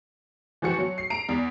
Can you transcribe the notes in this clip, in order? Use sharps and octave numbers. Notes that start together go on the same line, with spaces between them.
E3 F3 F#4 C#7
F#3
C7
A#5 D7 F7
E2